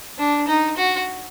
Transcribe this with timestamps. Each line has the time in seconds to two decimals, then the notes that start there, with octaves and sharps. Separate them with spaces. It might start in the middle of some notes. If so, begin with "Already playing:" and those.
0.19 D4
0.48 D#4
0.77 F#4